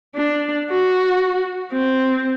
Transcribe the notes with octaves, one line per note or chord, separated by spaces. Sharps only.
D4
F#4
C4